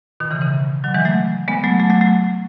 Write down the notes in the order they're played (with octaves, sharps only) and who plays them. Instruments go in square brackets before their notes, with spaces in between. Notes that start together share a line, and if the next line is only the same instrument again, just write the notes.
[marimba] B2 D#3
C#3 E3
C#3 E3
D#3 F#3
E3 G#3
F#3 A3
G#3 B3
F#3 A3
F#3 A3
F#3 A3
F#3 A3